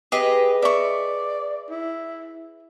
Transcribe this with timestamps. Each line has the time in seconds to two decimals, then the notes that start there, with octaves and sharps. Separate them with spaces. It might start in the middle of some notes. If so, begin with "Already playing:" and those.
0.12 G4 G#4 B4 D#5
0.62 D5 E5 C#6
1.70 E4